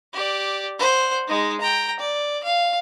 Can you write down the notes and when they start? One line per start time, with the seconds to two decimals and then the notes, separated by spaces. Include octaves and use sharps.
0.14 G4 D5
0.79 C5 F#5
1.28 G#3 D#4
1.60 G5 A#5
1.99 D5
2.44 F5